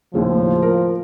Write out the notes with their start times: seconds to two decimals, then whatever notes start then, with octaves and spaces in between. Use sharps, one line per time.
0.14 D#2 A2 C#3 F3
0.62 A#4